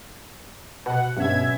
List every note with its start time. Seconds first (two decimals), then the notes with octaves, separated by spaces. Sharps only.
0.86 B2 F#5
1.17 G2 B2 F#3 B3 C#4 E5 G#6